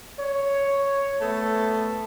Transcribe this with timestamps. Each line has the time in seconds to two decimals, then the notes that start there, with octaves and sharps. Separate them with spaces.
0.19 C#5
1.20 A3 B3 A4